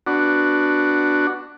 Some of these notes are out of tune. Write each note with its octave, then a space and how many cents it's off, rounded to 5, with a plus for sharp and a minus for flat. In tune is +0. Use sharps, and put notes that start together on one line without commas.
B3 +0 D4 +0 F#4 +0